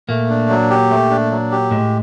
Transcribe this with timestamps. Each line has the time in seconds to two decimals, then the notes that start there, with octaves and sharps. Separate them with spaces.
0.09 A#2 A3 A#3
0.29 D4
0.50 F#3
0.70 G4
0.90 A3
1.10 D4
1.31 F#3
1.51 G4
1.71 A2 G#3 A3